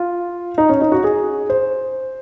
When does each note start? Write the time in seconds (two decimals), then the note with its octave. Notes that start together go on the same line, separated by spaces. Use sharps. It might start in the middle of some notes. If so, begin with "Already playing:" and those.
Already playing: F4
0.58 D#4
0.69 C#4
0.81 D#4
0.92 F#4
1.04 G#4
1.50 C5